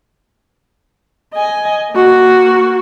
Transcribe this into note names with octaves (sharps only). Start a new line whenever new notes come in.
D#5 G#5
A#3 F#4